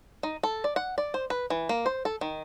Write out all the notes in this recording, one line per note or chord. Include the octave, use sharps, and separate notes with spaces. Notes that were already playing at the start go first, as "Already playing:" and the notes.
D#4
A4
D5
F#5
D5
C5
B4
E3
A#3
C5
A4
D#3